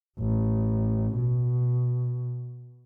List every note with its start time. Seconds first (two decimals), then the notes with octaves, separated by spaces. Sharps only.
0.19 A1
1.15 B2